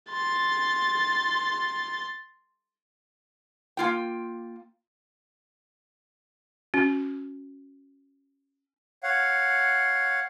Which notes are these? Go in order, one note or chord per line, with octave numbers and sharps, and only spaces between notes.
C6 A6
A#3 F4 G5
C#4 F#4
C#5 F5 F#5